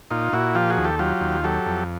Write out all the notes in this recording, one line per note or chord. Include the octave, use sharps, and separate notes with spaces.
A#2 D#4 F4
A#2 E4 F#4
F3 F4 G4
F#4 G#4
D#2
G4 A4
F#3 F4 G4
D#2
F#3 G4 A4
F2